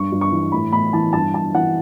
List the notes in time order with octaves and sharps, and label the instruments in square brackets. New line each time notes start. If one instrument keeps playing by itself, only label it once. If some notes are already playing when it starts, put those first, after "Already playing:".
Already playing: [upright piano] G2 C#6
G2
C#6
E3
A2 B5
A2 B5
E3 A5
G2 A5
G2 A5
E3 F#5